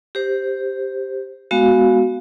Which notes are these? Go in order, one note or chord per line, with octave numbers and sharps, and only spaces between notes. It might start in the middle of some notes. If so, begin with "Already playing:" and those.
G4 C5
G#3 B3 F#4 F5